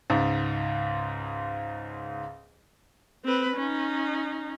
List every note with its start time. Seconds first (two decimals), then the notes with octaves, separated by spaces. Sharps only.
0.10 C#2 G#2
3.25 C4 B4
3.56 C#4 D#4